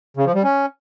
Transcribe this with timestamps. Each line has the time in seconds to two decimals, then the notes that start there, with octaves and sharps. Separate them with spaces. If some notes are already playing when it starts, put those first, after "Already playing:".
0.17 C#3
0.26 F3
0.35 G3
0.43 C#4